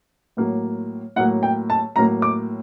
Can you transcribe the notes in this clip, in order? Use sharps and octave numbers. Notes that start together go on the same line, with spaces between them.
A2 F#3 A#3
A2 F#3 A#3 F#5
G5
A5
A2 F#3 A#3 A#5
D6